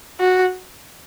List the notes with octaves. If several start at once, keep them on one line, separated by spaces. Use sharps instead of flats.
F#4